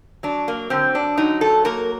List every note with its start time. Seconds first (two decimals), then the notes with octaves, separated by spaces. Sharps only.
0.23 F#3 D4
0.48 A#3
0.70 D3 C4
0.95 D4
1.18 F#3 D#4
1.41 A4
1.65 A#3 A#4